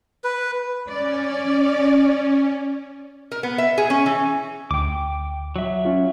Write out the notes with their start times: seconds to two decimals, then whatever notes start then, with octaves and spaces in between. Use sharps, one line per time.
0.24 B4
0.89 C#4 D5
3.32 A#4
3.43 B3
3.58 E5
3.78 G#4
3.90 C#4
4.06 E3
4.71 D2 G5 D6
5.56 F#3 E5
5.85 C#4 F4